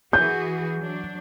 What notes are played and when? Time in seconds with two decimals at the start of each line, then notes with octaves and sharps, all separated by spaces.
0.13 E3 F#4 G#4 G6
0.78 F#3 D4